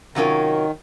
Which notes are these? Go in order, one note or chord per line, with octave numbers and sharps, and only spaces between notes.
C3 D#3 F#3 C#4 F4 A#4